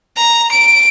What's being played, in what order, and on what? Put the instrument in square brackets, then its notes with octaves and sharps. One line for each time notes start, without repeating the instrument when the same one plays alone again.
[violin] A#5
D7